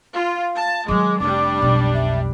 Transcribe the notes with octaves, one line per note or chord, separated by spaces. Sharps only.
F4 F5
A5
D#3 F#3 G#3 D6
F1 G3 D4 D6
B1 F2
E5